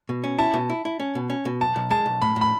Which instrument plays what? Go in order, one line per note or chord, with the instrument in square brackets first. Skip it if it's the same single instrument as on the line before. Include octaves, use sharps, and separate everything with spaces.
[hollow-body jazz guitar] B2
C#4
[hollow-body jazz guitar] E4 [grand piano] A5
[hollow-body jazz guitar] B2
E4
E4
C#4
B2
C#4
B2
[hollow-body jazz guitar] B1 [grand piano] A5
[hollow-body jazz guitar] B1
[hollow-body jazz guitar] G#3 [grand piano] A5
[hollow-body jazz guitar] B1
[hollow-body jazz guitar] A2 [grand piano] B5
[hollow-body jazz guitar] A2
[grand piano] B5